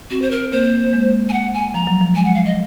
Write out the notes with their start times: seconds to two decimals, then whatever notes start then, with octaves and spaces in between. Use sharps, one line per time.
0.10 C4 F#4
0.22 C5
0.31 A#4
0.45 C4
0.52 A#3 C5
0.87 A#3
0.93 G#3
1.29 G#5
1.33 F#5
1.54 G#5
1.74 F3 A#5
1.87 F#3
2.01 F3
2.14 G#3 G#5
2.25 F#5
2.35 F5
2.45 D#5